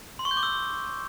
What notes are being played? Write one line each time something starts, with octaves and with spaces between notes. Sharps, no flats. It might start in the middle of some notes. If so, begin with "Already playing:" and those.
C6
C#6
G6
D6
E6